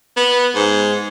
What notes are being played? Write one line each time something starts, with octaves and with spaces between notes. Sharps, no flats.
B3
G#2